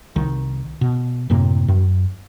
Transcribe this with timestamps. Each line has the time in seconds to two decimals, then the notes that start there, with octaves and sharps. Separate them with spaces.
0.16 C2 D#3
0.81 B2
1.30 F#2 A2 C3 A#3
1.68 F#2